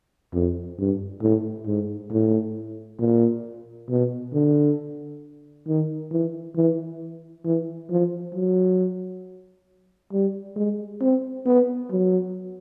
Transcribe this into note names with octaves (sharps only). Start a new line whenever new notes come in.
F2
G2
A2
G#2
A2
A#2
B2
D3
D#3
E3
E3
E3
F3
F#3
G3
G#3
C4
B3
F#3